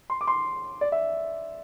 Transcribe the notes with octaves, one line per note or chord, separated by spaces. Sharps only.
C6
D6
C6
D5
E5